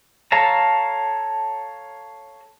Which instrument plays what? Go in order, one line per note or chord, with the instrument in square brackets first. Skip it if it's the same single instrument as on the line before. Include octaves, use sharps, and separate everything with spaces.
[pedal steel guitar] A4 C#5 F5 A5 A#5